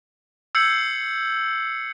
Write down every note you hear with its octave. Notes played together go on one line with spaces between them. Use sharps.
E6 G6 G#6 C7 C#7 F#7